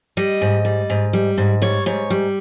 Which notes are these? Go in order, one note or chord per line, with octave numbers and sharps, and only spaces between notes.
G3 D#5
G#2
G3
G#2
G3
G#2
G3 C#5
G#2 C#5
G3